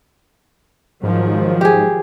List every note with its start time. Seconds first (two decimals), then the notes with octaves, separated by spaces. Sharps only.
1.03 G#2 D#3 F3 F#3
1.61 G4 G#4